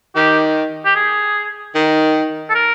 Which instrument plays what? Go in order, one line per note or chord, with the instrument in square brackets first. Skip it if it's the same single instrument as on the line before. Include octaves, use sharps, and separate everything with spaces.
[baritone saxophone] D#3 [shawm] G4
[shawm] G4
G#4
[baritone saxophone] D#3
[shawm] A4
A#4